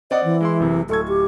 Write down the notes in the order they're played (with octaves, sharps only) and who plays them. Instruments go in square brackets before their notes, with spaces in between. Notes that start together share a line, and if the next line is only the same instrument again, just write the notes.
[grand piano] C4 D5 F#5 [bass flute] D#5
[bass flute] E3
[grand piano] G#3 E4 C6
F#1 C3
[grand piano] D1 C#6 G#6 [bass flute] A4
[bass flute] G4